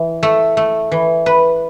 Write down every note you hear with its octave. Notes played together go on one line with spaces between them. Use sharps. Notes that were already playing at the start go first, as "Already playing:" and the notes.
Already playing: E3
A3
A3
E3
B4